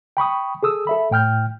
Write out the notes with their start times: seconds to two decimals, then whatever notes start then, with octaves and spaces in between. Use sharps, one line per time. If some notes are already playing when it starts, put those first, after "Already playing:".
0.17 G5 B5 C#6 D#6
0.63 G#4 A4 D#6 E6
0.87 A4 E5 B5
1.11 A2 G5 F6 G6